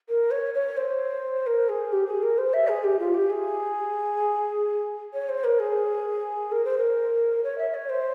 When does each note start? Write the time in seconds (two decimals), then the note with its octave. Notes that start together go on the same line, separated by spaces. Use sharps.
0.09 A#4
0.31 C#5
0.54 C#5
0.77 C5
1.47 A#4
1.69 G#4
1.92 G4
2.07 G#4
2.23 A#4
2.38 C5
2.53 E5
2.68 G#4
2.84 G4
2.99 F4
3.14 G4
3.30 G#4
5.14 C#5
5.29 C5
5.44 A#4
5.59 G#4
6.52 A#4
6.65 C5
6.78 A#4
7.44 C#5
7.58 E5
7.74 C#5
7.89 C5